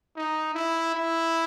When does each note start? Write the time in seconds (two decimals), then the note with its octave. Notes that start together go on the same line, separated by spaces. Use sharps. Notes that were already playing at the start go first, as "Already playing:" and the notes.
0.16 D#4
0.54 E4
0.95 E4